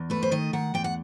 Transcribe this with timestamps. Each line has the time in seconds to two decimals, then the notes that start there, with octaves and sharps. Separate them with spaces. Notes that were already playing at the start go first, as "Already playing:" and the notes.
Already playing: E2
0.10 A3 B4
0.23 C5
0.32 D#3 D#5
0.53 D#3 F#5
0.74 E2 G5
0.84 F#5